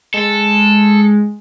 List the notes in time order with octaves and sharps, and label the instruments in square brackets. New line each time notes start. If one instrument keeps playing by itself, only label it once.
[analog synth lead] G#3 [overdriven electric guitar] A4